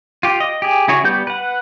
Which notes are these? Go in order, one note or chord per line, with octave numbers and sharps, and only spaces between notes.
F4 G4
D#5
G4 G#4
C#3 E4 F#4 G#4 C#5
G3 B3 G4 G6
B4 F#5